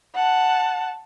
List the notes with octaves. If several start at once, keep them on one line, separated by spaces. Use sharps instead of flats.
F#5 A5